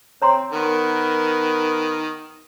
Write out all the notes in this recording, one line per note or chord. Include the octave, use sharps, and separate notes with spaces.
C4 C#5 A#5 C6
D#3 B3 A#4